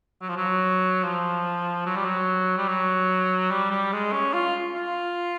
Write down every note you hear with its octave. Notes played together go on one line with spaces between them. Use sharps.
F#3
F3
F#3
F3
F#3
G3
F#3
G3
F#3
G3
G3
G#3
C#4
F4
F4